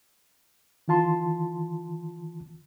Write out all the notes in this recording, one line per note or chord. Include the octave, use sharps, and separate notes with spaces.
D#3 E3 F4 A5 C6